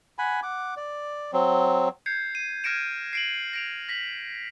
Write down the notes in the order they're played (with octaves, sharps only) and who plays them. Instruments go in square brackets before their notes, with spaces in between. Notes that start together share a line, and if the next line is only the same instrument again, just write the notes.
[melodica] F#5 G#5 B5
F#5 D6
D5
F#3 C4
[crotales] G6 G#6 C7 C#7
D#7
F6 G#6 A#6 C#7 D7 E7
C7 D7 F#7
A#6 D7 F7
A#6 B6 F#7